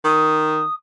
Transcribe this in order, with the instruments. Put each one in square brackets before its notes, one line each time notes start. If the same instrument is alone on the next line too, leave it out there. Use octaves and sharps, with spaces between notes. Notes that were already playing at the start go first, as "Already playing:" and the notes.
[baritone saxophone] D#3 [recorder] D#6